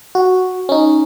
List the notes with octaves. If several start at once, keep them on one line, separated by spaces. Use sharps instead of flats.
F#4
C#4 D#4